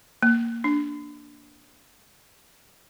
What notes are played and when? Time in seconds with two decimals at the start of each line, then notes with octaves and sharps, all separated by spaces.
0.23 A#3
0.64 D4